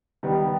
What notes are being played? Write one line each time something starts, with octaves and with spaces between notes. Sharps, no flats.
D#2 D#3 G3 B3